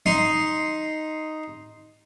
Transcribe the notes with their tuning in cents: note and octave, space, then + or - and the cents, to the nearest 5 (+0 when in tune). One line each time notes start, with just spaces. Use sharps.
D#4 +0 C6 +0